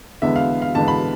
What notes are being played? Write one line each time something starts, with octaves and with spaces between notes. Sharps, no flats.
E2 D3 G#3 B3 E5
F5
F5
E2 D3 G#3 B3 A5
B5